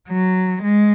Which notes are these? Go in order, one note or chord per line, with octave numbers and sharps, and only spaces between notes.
F#3
G#3